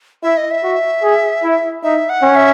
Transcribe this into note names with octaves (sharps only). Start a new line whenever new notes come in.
E4 E5
D#5
E5
F#4
G#4
E4
D#4 E5
F#5
C#4
E5